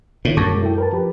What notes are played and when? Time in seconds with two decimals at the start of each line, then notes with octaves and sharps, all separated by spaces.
0.25 A2 D3 D#3
0.37 F#2 A5 C#6 D6
0.50 B2 G#3
0.62 E4 A4 G5
0.78 A#4 B4 A5
0.92 F3 G4 B4